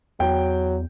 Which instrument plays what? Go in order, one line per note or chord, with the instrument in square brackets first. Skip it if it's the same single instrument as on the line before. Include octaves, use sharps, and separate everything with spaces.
[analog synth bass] E2 [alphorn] F#3 [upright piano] G5